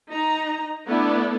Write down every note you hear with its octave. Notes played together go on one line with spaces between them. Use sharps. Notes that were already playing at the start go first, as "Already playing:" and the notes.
D#4 A#5
A3 B3 D4 E4